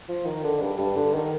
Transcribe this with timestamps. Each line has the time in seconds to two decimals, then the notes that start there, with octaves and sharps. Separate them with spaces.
0.08 F3
0.25 D#3
0.44 D3
0.61 G2
0.78 G2
0.96 D3
1.14 D#3